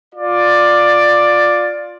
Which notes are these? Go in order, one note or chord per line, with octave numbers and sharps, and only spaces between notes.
F4 D5